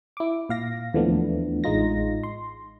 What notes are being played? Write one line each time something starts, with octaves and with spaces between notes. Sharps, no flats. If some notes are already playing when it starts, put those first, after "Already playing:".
E4 D6
A#2 F5 A#6
D#2 E3 F3 A3 B3 D4
A1 G#3 D#4 F4 A#6
C6